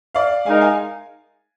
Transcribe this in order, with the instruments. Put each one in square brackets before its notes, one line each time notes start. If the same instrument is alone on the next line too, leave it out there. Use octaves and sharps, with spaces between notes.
[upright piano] D5 F5
[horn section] G#3 D#4 A#4 [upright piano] F5 G#5
[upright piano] F5 G#5